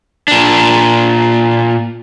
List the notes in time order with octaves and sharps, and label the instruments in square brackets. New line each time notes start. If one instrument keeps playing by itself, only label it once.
[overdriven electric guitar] A#2 D4